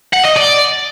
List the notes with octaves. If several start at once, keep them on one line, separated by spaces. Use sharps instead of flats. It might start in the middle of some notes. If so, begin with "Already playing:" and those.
F#5
D#5
D5